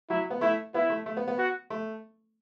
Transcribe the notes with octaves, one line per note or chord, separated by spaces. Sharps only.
F#3 E4
B3
A3 E4
B3 E4
A3
A3
B3
B3
F#4
A3